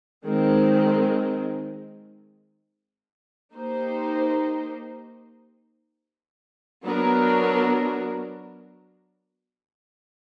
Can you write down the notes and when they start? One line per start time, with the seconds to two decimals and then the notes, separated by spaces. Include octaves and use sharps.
0.25 D#3 G#3 C4
3.53 A#3 D#4 G4 C5
6.84 F#3 B3 D4 F#4 A#4